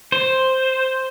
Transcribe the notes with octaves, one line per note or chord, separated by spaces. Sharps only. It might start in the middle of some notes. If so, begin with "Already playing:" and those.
C5